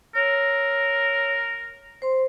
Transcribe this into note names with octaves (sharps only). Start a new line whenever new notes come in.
A#4 C#5 E6
C5 C6